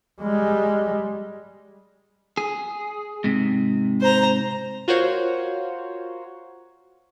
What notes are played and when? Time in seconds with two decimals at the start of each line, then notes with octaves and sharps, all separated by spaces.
0.22 G3 G#3
2.37 G#4
3.24 G#2 C3
4.01 C5 A#5
4.88 F4 F#4 A#4 C5 C#5